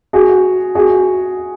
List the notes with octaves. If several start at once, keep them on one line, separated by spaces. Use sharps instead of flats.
F#4 G#4
F#4 G#4